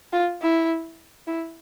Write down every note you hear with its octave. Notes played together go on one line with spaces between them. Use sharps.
F4
E4
E4